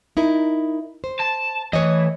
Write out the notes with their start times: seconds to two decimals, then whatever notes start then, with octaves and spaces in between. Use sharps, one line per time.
0.17 D#4 E4 A#4
1.04 C5
1.19 A5
1.73 E3 A3 C#5 D#5